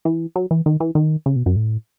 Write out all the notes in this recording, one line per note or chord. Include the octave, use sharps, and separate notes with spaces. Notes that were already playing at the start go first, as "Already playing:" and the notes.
E3
F#3
E3
D#3
E3
D#3
C#3
B2
F#2
A2